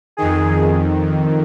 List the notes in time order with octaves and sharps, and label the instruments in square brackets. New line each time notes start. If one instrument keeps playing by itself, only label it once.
[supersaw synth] F2 D#3 G#4